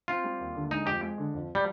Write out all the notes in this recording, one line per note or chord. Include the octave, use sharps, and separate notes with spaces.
C4 F4
G3
D#2
D3
G#3 D#4
F2 G4
G#3
D3
F2
G3